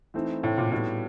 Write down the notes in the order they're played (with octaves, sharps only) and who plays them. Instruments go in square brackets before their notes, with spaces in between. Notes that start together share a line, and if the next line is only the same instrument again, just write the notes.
[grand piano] E3 A3 C4 D#4
[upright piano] A2
A#2
[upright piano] A2 [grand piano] G3 B3 D#4 F#4